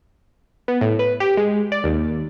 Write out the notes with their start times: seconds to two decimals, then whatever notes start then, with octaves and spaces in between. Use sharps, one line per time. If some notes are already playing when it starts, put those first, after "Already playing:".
0.68 B3
0.81 A2
0.99 B4
1.20 G4
1.37 G#3
1.72 D5
1.84 D#2